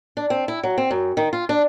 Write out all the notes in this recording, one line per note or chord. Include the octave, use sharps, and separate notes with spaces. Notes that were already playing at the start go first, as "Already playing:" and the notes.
D4
C4
E4
F#3
C4
F#2
D#3
F4
D4